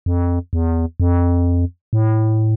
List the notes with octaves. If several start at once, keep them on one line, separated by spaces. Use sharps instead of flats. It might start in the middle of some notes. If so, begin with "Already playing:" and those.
F2
E2
F2
A2